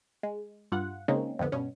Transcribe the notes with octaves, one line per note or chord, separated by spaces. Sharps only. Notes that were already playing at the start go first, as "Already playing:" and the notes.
G#3
G2 F4 F#5
C#3 G#3 A#3 C4 C#4 D#4
F2 A2 D3 B3
G2 B2 C#4